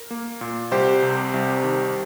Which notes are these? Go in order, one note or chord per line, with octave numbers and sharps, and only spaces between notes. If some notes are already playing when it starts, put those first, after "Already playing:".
Already playing: A#4
A#3
A#2
C2 G4 C5
C3
C2
D#3